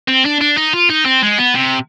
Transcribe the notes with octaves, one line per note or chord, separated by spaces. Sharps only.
C4
D4
D4
D#4
F4
D#4
C4
G#3
B3
C3